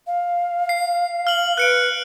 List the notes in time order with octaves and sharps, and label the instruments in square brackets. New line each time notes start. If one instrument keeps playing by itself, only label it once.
[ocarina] F5
[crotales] C7
F6 F#7
[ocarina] B4 [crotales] F#6 C#7 D7